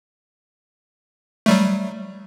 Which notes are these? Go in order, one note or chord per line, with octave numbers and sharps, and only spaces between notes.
F#3 G3 A3